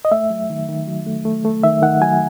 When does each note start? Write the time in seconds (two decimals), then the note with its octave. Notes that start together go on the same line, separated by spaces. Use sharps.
0.05 D#5
0.11 A3 E5
0.30 F#3
0.50 D#3
0.69 D#3
0.87 F#3
1.06 A3
1.25 A3
1.45 A3
1.63 D#3 E5
1.82 D#3 F#5
2.01 F#3 G#5